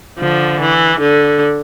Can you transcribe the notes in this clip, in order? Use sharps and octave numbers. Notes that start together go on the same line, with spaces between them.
D3 F3
E3
D3